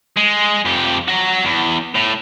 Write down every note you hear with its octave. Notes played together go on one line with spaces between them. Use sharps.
G#3
F2 G4
F#4 A#5
E2
A2